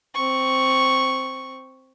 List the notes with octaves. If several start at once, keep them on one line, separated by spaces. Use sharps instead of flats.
C4 C#6